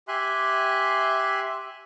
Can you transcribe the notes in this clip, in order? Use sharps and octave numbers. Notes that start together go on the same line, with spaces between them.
G4 E5 G#5 C6 F#6